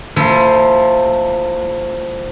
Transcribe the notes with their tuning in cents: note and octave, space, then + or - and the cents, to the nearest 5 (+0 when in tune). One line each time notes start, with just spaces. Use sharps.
F3 +0 A#3 -45 E4 +0